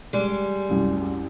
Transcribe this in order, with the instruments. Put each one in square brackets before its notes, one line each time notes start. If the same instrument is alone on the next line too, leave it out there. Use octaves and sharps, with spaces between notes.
[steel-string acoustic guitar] G3 G#3
[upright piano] C2 F#2